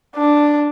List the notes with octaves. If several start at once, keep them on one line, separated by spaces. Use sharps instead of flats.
D4